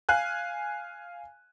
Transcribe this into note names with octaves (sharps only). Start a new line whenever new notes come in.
F5 G#5 F#6